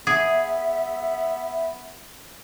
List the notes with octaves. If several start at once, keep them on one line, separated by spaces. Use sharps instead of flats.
B3 G#4 E5